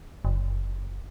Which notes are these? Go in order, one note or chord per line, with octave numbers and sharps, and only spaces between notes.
F#1